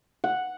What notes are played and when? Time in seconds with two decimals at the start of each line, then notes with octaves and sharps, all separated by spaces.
0.24 F#5